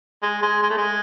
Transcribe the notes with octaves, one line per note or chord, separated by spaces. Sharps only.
G#3
G#3
G#3
A3
G#3